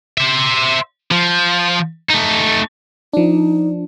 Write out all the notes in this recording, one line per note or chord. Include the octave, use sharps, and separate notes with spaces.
C5 E5
F3
A3 D#4
F3 D4 D#4